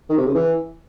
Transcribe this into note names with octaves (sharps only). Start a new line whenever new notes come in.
D#3
C3
C#3
E3